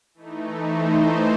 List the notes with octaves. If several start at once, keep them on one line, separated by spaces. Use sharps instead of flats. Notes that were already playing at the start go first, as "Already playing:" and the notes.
E3 A3 D#4
C5